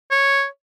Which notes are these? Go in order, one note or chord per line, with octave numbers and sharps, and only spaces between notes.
C#5